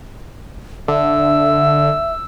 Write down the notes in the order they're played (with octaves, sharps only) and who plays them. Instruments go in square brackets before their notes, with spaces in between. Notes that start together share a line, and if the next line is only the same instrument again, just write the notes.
[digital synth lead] D3 [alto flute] E5 [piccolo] E6